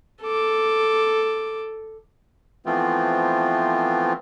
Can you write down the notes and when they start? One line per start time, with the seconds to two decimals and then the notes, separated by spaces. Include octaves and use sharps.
0.23 A4 D6
2.66 E3 F3 A3 B3 C4 F4